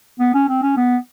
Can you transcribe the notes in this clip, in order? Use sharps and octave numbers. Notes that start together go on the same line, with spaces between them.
B3
C#4
C4
C#4
B3